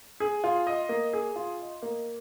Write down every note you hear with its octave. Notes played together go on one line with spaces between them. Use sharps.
G#4
F4
D#5
A#3
G#4
F4
D#5
A#3